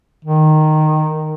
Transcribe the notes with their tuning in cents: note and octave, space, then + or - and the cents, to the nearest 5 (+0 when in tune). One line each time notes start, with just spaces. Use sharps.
D#3 -10